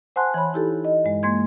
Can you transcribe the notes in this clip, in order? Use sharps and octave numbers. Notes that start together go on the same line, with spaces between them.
C5 F#5 G#5 A5 C6 F#6
E3 C#5 B5
D#4 E4 G4 A4
D#5
G2 G#3
G#3 A#3 C6 G#6